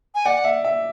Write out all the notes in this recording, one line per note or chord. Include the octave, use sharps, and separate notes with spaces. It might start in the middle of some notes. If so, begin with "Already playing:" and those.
G#5
D5 F#5
E5
E5